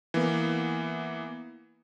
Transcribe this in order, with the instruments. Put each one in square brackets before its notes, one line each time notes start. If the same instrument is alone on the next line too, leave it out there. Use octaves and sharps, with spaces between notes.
[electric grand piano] E3 A#3 B3